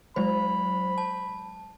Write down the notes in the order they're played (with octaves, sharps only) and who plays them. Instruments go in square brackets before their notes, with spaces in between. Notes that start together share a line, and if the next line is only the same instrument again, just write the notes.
[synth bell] F#3 G#3 C5 [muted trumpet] B5
[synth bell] A5